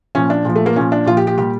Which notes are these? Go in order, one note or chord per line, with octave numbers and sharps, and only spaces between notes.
A#2 F3 C#4
D4
A#2 F3
A3
A#3
A#2 F3 C#4
D4
A#2 F3 F4
G4
G4
A#2 G3 G4